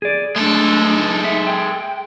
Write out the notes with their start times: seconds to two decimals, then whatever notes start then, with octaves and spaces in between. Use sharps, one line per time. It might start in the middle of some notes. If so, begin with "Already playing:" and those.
0.02 G#4 D5
0.36 G#3 A3 D4 A4
0.97 D#4
1.24 E5
1.47 G5